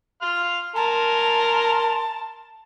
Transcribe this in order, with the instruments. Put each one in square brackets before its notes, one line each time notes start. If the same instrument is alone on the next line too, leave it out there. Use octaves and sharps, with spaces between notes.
[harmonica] F5 C6 F6
[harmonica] A#4 G#5 C6 [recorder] A5